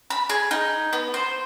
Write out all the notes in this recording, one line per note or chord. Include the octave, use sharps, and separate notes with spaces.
B5
G#4
D#4
B3
C5